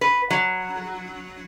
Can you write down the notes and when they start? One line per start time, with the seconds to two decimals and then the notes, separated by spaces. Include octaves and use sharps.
0.01 B4
0.30 F#3